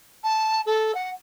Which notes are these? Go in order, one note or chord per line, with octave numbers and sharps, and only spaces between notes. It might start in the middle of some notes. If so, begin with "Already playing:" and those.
A5
A4
F#5